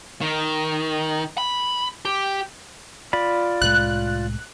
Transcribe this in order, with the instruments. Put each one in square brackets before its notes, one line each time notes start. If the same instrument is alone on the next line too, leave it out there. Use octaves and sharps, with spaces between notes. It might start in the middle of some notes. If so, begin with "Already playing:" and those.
[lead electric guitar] D#3
B5
G4
[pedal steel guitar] F4 D5 B5
[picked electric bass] C2 A2 G#3 [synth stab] F#6